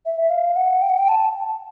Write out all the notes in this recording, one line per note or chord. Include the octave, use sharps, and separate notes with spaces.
E5
E5
F5
F#5
G5
F#5
G5
A5